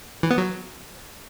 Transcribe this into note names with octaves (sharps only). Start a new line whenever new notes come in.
E3
B3
F#3